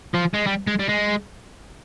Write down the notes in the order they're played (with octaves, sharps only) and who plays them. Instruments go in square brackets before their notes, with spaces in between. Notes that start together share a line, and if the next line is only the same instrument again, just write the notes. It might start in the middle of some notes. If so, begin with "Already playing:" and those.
[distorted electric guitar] F3
G#3
G3
G#3
G3
G#3